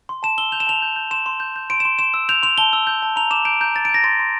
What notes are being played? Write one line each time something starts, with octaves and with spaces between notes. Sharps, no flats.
C6
A5 E7
E6 G7
G6 F7
E7
A5 F7
G6
G6
C6 E7
C6
G6
G6
C6 D7
E7
C6
C6 E7
E6
G6 F7
C6 F7
A5 G7
E6
G6
A5
A#5 F7
D6 E7
G6 D7
A#5 G6
G6 A6
D7
G6
A#6
C6 A6
C6